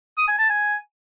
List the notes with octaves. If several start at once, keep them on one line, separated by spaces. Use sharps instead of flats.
D#6
G#5
A5
G#5